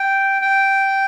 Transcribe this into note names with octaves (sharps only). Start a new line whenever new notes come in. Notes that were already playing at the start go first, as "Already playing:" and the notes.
Already playing: G5
G5